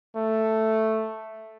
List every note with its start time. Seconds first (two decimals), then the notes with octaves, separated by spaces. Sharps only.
0.16 A3